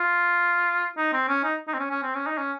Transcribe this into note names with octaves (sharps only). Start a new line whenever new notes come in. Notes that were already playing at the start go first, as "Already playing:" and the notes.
Already playing: F4
D#4
C4
C#4
D#4
D#4
C4
C#4
C#4
C4
C#4
D#4
C#4